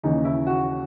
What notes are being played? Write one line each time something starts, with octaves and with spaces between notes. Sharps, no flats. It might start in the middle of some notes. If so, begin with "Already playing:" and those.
D#2 C#3 E3 D#4
E4
F#4